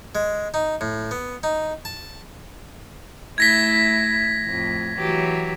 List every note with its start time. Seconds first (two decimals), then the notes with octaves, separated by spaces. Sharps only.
0.15 G#3
0.54 D#4
0.81 A2
1.11 B3
1.43 D#4
1.85 A5
3.38 A3 E4 G#6 A#6 B6
4.45 F2 A2
4.98 E3 F#3 G4